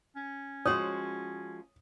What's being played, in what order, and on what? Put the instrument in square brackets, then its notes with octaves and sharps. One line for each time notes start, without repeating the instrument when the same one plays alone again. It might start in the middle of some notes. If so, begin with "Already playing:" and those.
[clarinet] C#4
[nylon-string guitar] F3 G#3 F#4 [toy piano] C#5 [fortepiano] D#6